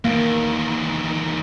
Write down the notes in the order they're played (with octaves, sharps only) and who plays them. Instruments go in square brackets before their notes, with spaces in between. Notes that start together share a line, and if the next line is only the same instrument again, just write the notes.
[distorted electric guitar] E2 D#3 [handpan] A#3